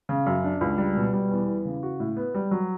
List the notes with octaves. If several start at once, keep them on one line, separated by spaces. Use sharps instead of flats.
C#3
F#2
D4
C#2
G3
B2
G3
E2
E3
C#3
F#4
A2
B3
G3
F#3